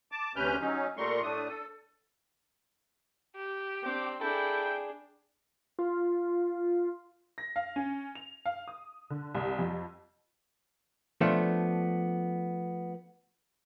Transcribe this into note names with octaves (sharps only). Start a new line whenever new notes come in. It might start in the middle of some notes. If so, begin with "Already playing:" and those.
A5 D6
D2 C3 C#4 B4 F6 G6
F#3 C#4 D#4
A#2 G3 A3 A#4 C6 C#6
A2 A3 D4 D#6
A4
G4
C4 D4 G5 D6
D4 E4 G#4 A4 G5
F4
A#6
F5
C#4
F7
F5
D#6
D3
C2
F2
F3 A3 B3 D4